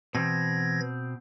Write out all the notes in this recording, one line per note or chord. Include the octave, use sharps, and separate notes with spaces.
B2 E3 C4 G#6 A#6